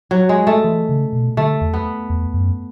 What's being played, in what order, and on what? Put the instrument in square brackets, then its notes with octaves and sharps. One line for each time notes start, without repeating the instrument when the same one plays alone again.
[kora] F#3
G#3
A3
[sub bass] E3
C#3
B2
[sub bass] D3 [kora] A3
[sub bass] E2
[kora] B3
[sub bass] E2
F#2